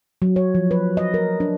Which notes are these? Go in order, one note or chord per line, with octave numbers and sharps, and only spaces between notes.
F#3
C#5
F3
B4
D#5
A#4
D4